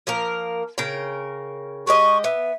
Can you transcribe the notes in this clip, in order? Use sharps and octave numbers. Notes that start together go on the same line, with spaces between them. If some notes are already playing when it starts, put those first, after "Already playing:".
F3 A#3 A#4
C#3 A#4 G5
G#3 G4 D#5 C#6
B3 E5